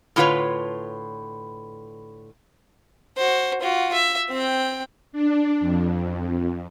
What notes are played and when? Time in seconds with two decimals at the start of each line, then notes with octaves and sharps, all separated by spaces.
0.16 A2 D3 F4 F#4 B4 C#5
3.17 F#4 C5
3.62 F4 F#4
3.93 E5
4.30 C4 G5
5.13 D4
5.61 F2